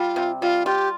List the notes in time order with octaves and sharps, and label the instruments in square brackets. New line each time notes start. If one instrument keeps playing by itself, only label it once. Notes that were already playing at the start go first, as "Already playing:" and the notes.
Already playing: [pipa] G3 [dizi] F4
[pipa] C3
[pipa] G3 [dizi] F4
[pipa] F4 [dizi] G4